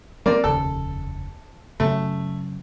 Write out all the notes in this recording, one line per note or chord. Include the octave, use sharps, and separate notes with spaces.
G3 A#3 C4 D5
F1 D#2 C#3 A4
F#2 C#3 A3